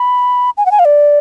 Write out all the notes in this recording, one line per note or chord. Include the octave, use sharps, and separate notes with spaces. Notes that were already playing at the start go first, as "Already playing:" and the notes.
Already playing: B5
G#5
F#5
G#5
F5
D5